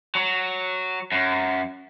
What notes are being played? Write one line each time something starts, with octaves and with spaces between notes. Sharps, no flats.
F#3
F#2